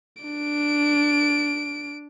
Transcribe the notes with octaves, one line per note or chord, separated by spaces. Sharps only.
D4 D7